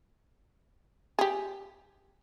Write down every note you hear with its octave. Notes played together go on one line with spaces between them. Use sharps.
G4 G#4